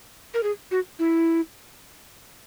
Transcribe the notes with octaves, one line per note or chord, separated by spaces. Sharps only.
A#4
G#4
F#4
E4